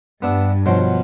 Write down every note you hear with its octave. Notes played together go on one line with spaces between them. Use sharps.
G2 B3 D4 E4
B2 F3 F#3 C5